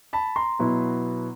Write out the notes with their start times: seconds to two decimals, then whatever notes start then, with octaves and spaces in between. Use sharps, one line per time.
0.13 A5 B5
0.36 A#5 C6
0.59 B2 F#3 B3 E4